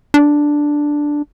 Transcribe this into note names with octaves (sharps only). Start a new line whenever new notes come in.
D4